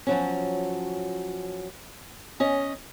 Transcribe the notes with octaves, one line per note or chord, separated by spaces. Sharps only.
F3 F#3 C#4
C#4 D#5